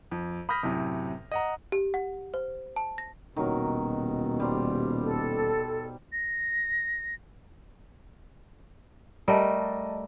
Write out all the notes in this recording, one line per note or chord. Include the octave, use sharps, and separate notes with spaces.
F2
B5 D#6 F6 G6 A#6 B6
F#2 A2 C3
D#5 F#5 A#5
G4
F#5
C5
A5
A#6
D#1 B2 D#3 F#3 A#4
G3 C5 D5
A4
A#6
G3 A3 A#4 D#5 A5